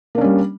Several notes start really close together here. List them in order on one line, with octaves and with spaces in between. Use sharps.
A#3 D4 C#4 G3